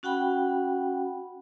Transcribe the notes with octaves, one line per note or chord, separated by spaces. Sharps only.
C#4 F#4 F#5 G5 B5